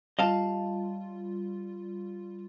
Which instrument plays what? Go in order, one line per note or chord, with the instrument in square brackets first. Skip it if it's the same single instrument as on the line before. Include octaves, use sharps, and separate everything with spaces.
[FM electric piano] G3 F4 [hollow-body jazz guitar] D#5 F5 A5